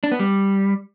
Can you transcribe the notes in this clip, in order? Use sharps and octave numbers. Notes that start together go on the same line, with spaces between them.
D4
B3
G3